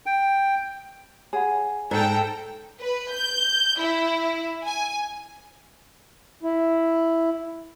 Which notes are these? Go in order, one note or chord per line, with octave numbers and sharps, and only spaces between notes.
G5
G#4 C#5 F#5 B5
G#2 A4 G5 A#5
B4
G6
E4
G#5
E4